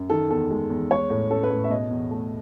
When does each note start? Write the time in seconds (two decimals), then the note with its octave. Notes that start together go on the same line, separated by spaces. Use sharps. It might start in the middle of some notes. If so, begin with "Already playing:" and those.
Already playing: F#2
0.10 D#3 A4
0.30 E2 A4
0.50 G#3
0.70 E2
0.90 G#3 C#5
1.10 A2
1.30 C#4 A4
1.43 B4
1.50 A2
1.64 E5
1.70 B2 D#5
1.90 E2
2.11 A3